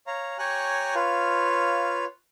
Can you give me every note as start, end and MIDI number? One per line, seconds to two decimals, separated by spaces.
0.07 0.38 73
0.07 0.38 77
0.07 0.38 82
0.39 0.95 67
0.39 0.95 73
0.39 0.95 80
0.39 0.95 82
0.39 0.95 85
0.39 0.95 90
0.95 2.05 65
0.95 2.05 71
0.95 2.05 73
0.95 2.05 77